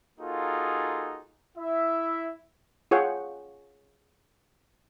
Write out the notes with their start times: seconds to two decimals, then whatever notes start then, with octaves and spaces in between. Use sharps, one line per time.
0.19 A#3 D#4 F4 F#4 G#4 A4
1.57 E4 E5
2.91 F4 G#4 C#5 F#5 G5